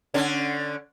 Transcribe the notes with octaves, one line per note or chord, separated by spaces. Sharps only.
D3 C#4